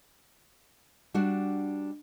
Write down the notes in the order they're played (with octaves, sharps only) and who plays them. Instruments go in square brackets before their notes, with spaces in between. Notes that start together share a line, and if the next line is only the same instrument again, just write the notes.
[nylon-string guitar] G3 D4 F#4 F#5